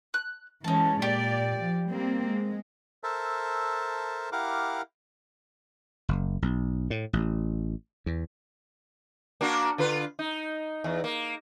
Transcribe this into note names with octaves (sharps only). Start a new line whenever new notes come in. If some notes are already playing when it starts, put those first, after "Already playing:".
F#6
E3 G#3 C#4 D#4 A5
A#2 G4 D5
F3
G3 A#3 C4
G#3
A4 A#4 C5 E5 A5
E4 G4 A#4 F5 F#5 D6
F#1
B1
A2
A1
E2
A#3 D4 F#4
D3 F4 B4
D#4
E2
A#3